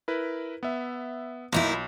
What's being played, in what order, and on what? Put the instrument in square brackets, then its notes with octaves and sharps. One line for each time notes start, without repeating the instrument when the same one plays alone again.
[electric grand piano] E4 A#4 B4
B3 E5
[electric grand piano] B1 C6 [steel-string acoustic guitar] A#3 D#4 E4